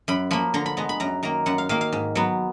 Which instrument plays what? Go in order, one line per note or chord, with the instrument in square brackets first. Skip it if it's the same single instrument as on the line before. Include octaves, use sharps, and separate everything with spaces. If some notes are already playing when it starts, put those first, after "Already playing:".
[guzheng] F#2 B5
F3 A#3 B5
D3 A#5
B5
G#3 B3 A#5
B5
F#2 A#5
D#3 A#3 A#5
F#2 F#5
F5
D#3 A#3 F5
F5
G#2
F#3 B3